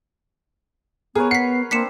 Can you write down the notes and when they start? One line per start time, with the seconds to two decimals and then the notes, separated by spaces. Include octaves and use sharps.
1.15 B3 G#4 A#4 B4 C#5
1.31 F#5 B6 C7
1.71 A#3 C4 D4 B6 C#7 E7